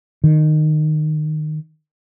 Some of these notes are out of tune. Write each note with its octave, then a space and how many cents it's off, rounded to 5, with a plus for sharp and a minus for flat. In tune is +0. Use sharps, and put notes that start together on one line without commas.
D#3 -20